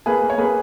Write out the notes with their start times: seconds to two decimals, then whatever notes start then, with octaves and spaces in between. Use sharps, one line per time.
0.06 A#3 G#4 B4
0.22 A#3
0.30 C#5
0.38 A#3 G#4 B4